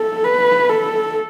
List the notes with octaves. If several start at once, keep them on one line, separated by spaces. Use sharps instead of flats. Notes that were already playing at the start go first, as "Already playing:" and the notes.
Already playing: A4
B4
A4